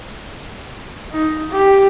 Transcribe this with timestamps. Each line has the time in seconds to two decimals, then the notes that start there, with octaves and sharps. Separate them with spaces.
1.13 D#4
1.52 G4